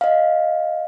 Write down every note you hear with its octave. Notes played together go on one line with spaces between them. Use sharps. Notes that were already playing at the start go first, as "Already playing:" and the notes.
D#5 F5